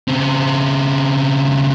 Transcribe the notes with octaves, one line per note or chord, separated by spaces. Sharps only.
C#3 C4